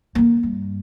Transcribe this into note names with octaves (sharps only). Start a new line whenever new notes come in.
D3 A#3
G2